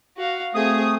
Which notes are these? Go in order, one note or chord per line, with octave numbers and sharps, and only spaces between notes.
F#4 F5
A3 C4 G#4 D#6